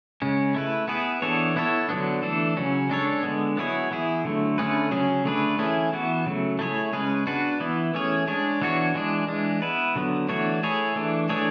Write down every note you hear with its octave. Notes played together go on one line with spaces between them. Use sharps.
C#3 G#3 C#4
A3 E4 B4
B3 E4 G#4 B4
E3 B3 D4 A4 C#5
B3 E4 A4 C#5
D3 F#3 B3 D4
E3 A3 D4 A4
C#3 F#3 C#4
G#3 D4 A4 C#5
D3 G#3 B3
F#3 B3 E4 G#4 C#5
E3 B3 E4 G#4
D3 F#3 A3
D3 A3 C#4 G#4 B4
C#3 F#3 C#4 G#4
D3 A3 D4 G#4 B4
E3 A3 C#4 E4 G#4
E3 B3 F#4
C#3 F#3 A3
A3 E4 G#4 C#5
C#3 G#3 C#4 G#4 B4
B3 D4 F#4 B4
E3 B3 E4
E3 A3 C#4 G#4 C#5
G#3 D4 G#4 C#5
E3 B3 D4 F#4 C#5
E3 G#3 D4 G#4
E3 G#3 D4
B3 E4 B4
D3 F#3 B3
E3 A3 D4 F#4 C#5
A3 E4 G#4 C#5
E3 A3 D4
E3 A3 D4 G#4 C#5